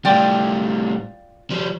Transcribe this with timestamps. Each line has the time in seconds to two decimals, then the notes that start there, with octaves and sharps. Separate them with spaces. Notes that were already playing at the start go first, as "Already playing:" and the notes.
0.05 A2 G3 F4 D5 G5
1.50 F3 G3